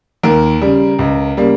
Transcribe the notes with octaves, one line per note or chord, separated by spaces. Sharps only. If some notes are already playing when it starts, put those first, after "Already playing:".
D#2 A#4
C#3 G3
C#2
C#3 G3 A#3